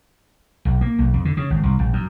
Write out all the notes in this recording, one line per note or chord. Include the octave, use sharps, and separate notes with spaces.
B1
A#3
B1
F2
D3
C#3
G#1
C2
A#1
F#2